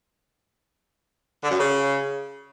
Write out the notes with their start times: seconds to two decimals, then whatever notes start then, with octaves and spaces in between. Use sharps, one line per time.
1.42 D3
1.51 F#2
1.59 C#3